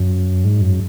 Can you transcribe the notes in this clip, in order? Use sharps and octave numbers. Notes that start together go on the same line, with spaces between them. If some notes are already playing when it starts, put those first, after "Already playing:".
Already playing: F#2
G#2
F#2